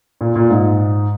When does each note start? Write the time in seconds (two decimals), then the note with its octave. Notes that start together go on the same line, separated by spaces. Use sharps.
0.21 A#2
0.36 A#2
0.50 G#2